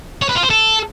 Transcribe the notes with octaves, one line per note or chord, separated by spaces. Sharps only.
C#5
B4
F4
C5
A4